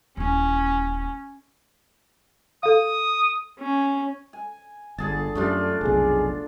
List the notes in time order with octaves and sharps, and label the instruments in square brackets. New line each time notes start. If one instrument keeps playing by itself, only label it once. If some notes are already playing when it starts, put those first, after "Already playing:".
[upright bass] D#1 E4 [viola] C#4
[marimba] A4 F5 [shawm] D#6
[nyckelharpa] C#4
[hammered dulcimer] G#5
[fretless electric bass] G1 [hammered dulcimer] D3 G#4 A5
[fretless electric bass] F#2 G3 [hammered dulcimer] A3 D4 F4
[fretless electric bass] F1 B1 [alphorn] G#4